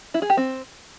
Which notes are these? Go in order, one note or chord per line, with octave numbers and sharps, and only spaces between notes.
E4
G#4
G4
C4